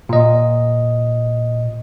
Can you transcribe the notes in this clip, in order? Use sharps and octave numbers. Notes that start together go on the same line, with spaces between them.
A#2 D#5